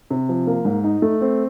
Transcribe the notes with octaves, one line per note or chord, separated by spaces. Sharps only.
C3
F3
A#3
G#2
D#4
A3
C4